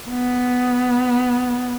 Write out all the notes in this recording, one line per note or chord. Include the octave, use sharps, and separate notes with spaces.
B3